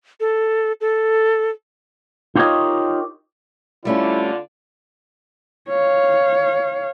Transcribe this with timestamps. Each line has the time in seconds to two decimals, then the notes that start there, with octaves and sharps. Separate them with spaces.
0.20 A4
0.81 A4
2.35 D#4 F4 G4 A#4 C#5 D#5
3.85 D3 G3 A3 C#4 E4 F4 D5
5.69 C#5 F5